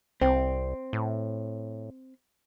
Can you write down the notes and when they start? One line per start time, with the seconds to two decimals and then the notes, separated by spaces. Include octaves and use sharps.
0.21 C2 C4
0.93 A2